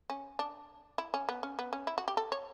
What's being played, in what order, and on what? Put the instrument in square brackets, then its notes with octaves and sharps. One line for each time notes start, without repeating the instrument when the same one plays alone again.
[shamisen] C#4
D4
E4
C#4
B3
C#4
B3
C#4
E4
F#4
G4
A4
C#5